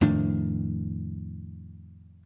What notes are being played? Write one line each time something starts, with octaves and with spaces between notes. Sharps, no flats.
F2 A2 D#3 D4